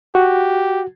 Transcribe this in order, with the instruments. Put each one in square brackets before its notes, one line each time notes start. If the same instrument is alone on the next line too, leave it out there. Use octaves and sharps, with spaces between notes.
[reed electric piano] F#4 [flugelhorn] G4